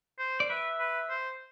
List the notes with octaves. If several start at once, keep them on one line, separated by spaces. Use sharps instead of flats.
C5
D5
B4 E5
B4
C5